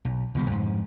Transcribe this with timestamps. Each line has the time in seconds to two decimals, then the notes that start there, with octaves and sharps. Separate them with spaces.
0.05 B1
0.35 C#2 B2 D#3 G3
0.50 F2 G#2